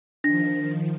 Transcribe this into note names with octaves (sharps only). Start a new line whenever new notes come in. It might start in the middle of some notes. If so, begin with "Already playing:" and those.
D#3 F3 D4 A#6